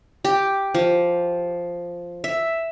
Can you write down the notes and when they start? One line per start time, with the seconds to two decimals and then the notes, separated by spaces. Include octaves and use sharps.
0.25 G4
0.75 F3
2.24 E5